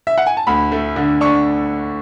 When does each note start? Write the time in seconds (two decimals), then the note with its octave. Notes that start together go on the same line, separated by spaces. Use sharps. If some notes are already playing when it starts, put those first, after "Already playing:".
0.07 E5
0.18 F#5
0.27 G#5
0.37 A5
0.47 D2 B5
0.72 A3
0.96 D3
1.21 D4 C#6